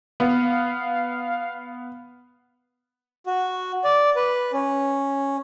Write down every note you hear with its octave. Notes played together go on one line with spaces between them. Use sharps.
B3 F5
F#4
D5
B4
C#4